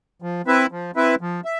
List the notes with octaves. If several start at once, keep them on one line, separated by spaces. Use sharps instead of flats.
F3
C4 E4 B4 E5
F3
C4 E4 B4 E5
F3
E5